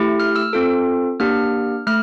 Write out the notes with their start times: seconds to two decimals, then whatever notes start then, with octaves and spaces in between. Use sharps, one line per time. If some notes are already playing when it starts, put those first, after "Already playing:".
Already playing: A3 E4 G4
0.20 F6
0.36 E6
0.53 C4 F4 A4
1.20 A#3 D4 G4 F6
1.87 A3 F6